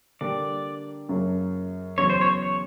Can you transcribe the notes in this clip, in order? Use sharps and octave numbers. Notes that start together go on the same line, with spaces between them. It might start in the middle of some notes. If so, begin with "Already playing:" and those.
D3 G3 A#3 D4 D5
F#2 C#3 F#3 A#3
E2 C#3 F#3 C#5
C5
C#5
C#5